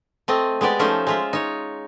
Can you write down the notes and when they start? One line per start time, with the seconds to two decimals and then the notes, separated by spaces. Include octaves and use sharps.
0.28 A3 C4 D#5
0.61 G#3 B3 G4 D5
0.79 F3 A3 C#4 D#4 C5 E5
1.07 G#3 F4 E5
1.33 D#4 C#5